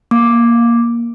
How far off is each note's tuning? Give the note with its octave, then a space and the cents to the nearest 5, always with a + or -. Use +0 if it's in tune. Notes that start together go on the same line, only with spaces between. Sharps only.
A#3 +10 D6 +0